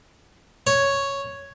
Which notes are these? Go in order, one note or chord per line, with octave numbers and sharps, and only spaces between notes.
C#5